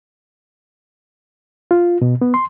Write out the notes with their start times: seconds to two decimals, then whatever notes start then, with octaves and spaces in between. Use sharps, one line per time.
1.71 F4
2.02 B2
2.21 B3
2.34 C6